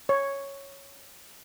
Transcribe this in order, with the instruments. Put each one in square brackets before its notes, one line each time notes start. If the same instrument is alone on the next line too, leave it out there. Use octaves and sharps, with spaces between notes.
[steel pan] C#5